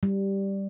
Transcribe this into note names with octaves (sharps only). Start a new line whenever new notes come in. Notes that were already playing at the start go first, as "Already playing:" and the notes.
G3